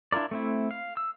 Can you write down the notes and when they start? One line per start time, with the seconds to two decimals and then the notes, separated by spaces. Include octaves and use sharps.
0.12 D4 E4 F4 A#4 D5
0.31 A3 C4 E4
0.71 F5
0.97 E6